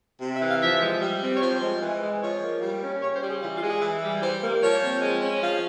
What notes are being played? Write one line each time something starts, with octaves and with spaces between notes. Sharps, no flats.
C3
E5
E3
F5
F3 E5
G#3
G3
C4
C#5
F3 C5
G#3
E3
G#3
F3 C#5
A#3
G3
C#4
C#3 C#5
C5
G3 G4
G#4
E3 F4
F4
G#3
G#4
E3
G3
G3 C5
A#3
F3 C#5
C4
G#3
C#4
F3 F5